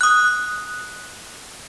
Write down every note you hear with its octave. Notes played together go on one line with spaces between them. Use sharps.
D#6 F#6